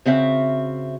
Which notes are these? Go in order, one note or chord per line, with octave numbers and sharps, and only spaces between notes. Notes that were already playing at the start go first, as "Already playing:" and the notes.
C#3 C4 F#4 E5 F5